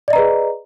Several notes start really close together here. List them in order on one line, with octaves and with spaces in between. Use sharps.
D5 D#5 A#5 B4 G#4